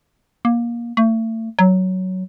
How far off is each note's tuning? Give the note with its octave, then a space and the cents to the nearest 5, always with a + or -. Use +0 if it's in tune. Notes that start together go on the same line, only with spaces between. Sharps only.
A#3 +20
A3 +35
F#3 +10